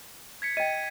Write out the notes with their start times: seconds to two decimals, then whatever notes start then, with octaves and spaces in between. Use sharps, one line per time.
0.42 G#6 B6 C#7
0.57 D#5 G5 D#7